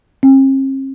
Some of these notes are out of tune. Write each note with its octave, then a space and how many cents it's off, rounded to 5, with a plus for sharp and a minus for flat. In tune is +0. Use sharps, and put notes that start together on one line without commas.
C4 +45